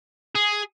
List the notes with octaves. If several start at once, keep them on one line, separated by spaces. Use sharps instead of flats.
G#4